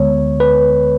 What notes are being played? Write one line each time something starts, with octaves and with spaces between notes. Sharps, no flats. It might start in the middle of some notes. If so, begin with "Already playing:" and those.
Already playing: D2 D3 G#3 B3 C#5
B4